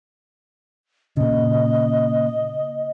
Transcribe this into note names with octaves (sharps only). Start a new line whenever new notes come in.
A#2 C#3 D#5